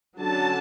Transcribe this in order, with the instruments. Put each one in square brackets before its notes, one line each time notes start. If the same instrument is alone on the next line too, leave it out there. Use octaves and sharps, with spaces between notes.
[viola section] D3 F#3 C#4 A5